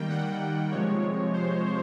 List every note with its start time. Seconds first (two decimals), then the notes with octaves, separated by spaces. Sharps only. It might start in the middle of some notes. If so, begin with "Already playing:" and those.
Already playing: D#3 G3 A#3 G5
0.09 F#5
0.71 C3 F3 G#3 C#5
1.33 C5